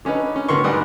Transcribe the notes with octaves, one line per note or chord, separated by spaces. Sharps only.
D3 C#4 D#4 B4
C#4
D2 D3 D#3 B3 C6 C#6
G#2 G3 B4 F#5 D#6